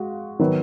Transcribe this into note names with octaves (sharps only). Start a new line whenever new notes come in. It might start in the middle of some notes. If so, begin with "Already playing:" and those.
Already playing: G#3 F#4 F5
D#3 F#3 B3 F#4 B4